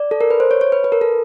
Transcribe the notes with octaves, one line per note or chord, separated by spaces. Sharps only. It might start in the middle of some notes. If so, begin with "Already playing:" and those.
Already playing: D5
A4
A#4
B4
C5
C#5
C#5
B4
B4
A#4
A4